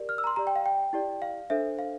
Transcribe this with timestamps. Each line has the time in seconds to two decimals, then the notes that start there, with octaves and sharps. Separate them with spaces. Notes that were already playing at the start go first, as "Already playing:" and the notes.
Already playing: G4 A#4 D5
0.09 F6
0.18 E6
0.24 A#5
0.27 C6
0.36 G4 D5 A#5
0.47 G5
0.56 F5
0.66 G5
0.93 E4 G4 D5
1.22 F5
1.50 D4 A4 C5 E5
1.79 F5